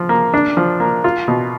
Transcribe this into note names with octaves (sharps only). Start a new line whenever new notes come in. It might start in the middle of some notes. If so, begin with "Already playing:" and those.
Already playing: F3
A#3
D4
F3
A#3
F4
B2